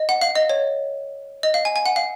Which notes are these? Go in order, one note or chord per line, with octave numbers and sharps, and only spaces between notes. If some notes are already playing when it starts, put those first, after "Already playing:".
Already playing: D#5
F#5
F5
D#5
C#5
D#5
F5
G#5
G#5
F#5
F5